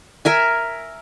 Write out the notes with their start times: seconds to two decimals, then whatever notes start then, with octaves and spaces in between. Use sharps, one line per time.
0.25 A#4 E5 G#5